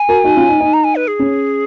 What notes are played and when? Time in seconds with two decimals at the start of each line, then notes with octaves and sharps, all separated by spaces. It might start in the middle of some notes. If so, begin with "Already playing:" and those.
Already playing: G#5
0.08 F#4 A#4
0.24 D#4 F#4
0.36 C#4 F4
0.49 D#4
0.60 D#4
0.73 A#5
0.84 G#5
0.96 B4
1.07 G#4
1.19 C#4